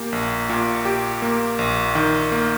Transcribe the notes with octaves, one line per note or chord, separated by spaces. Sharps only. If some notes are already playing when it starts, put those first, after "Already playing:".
Already playing: A#2 A#3 G4
A#1
A#2
G4
A#3
A#1
D#3
A#3